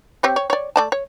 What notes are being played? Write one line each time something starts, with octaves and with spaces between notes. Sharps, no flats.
C4 G4 C#5
C#5
C#5 D5
A3 D5 A5
C#5